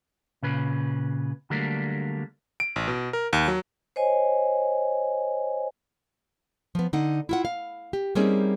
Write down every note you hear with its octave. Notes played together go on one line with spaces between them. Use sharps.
A#2 C#3 B4
D3 F#3 G3 A3 A#3 D4
D7
A1
B2
A#4
D#2
F#3
C5 C#5 D#5 G#5
F3 B3
D3 D#4 F#5
E4 F4 F#5
F5
G4
G3 A#3 C4 C#4 D#4 G#4